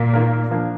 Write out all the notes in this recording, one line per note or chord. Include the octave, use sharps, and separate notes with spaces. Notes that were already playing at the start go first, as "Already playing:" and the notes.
Already playing: A#2
D#3 A#3 F4 A#4
F3 A#3 D4